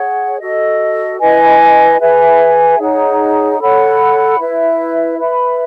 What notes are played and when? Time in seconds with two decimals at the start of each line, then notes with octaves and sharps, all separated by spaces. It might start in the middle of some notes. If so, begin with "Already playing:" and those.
Already playing: G#4 C#5 F#5
0.40 F#4 A4 D#5
1.20 E4 B4 D#5 G#5
2.00 G#4 B4 E5 G#5
2.79 D#4 G#4 C#5 F#5
3.59 A4 C#5 F#5 B5
4.39 E4 B4 E5
5.18 B4 E5 B5